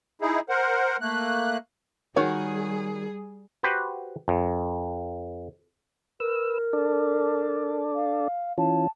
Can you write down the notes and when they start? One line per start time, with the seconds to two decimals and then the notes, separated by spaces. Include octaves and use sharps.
0.21 D#4 E4 G#4
0.49 A#4 C5 F#5
1.01 A3 A#3 F#6
2.16 D#3 G3 F#4 G#4 C#5
3.63 F#4 G4 B4 C5
4.28 F2
6.20 A#4 B4 E6
6.73 D4 A4 D5
7.95 F5
8.58 E3 C#4 F4 A5